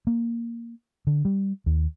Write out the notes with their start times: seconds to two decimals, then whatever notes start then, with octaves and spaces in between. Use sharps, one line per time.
0.07 A#3
1.07 D3
1.25 G3
1.66 D#2